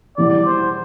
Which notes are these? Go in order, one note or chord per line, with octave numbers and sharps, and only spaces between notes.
E1 E2 E3 G3 D5
C5